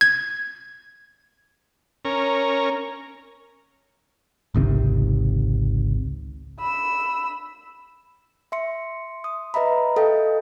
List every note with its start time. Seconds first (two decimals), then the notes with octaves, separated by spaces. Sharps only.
0.01 G#6
2.05 C#4 A#4
4.54 G#1 C#2 C3 D#3
6.60 B5 E6
8.52 E5 C6 C#7
9.24 D#6
9.54 B4 D#5 E5 A#5 B5
9.96 A4 D#5 F5 G5